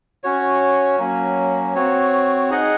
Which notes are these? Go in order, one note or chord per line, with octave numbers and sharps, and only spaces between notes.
C#4 F#4 C#5
F#3 A#3 C#4
C4 F#4 C#5
D#4 G#4 D#5 F#5